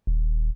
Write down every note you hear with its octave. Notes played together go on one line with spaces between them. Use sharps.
D#1